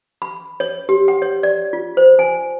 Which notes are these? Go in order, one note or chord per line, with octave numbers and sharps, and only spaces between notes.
B5
C#5
G4
F#5
C#5
D5
F4
C5
G#5